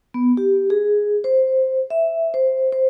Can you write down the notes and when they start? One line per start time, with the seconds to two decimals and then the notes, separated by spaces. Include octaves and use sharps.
0.14 B3
0.37 G4
0.70 G#4
1.24 C5
1.90 E5
2.34 C5
2.72 C5